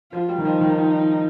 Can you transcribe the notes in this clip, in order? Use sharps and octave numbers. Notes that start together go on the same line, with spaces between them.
F3 F4
G3
D#3
F3 D#4
D#3
F3